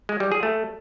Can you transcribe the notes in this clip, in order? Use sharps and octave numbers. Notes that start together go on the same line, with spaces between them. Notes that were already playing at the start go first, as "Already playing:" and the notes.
G#3
G3
G#4
A3